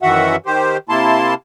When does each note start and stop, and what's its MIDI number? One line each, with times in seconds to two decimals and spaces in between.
0.02 0.36 42
0.02 0.36 51
0.02 0.36 52
0.02 0.36 66
0.02 0.36 76
0.02 0.36 78
0.46 0.77 51
0.46 0.77 67
0.46 0.77 72
0.89 1.34 48
0.89 1.34 58
0.89 1.34 64
0.89 1.34 81
0.89 1.34 84